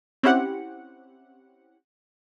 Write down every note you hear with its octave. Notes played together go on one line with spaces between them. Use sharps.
C4 C#4 E4 G4 F#5